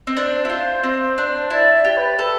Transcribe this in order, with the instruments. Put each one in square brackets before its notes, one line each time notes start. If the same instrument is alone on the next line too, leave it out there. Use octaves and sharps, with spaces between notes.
[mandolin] C4
[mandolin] D4 [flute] C5
[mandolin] E4
F4
C4
D4
[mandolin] E4 [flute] D5
[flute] D5
[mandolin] G4
[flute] B4
[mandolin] A4 [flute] B4